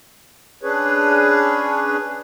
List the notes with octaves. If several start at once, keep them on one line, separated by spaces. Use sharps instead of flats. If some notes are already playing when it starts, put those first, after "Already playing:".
C#4 D4 G#4 B4 C#5